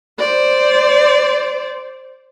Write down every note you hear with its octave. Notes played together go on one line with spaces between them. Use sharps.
C5 D5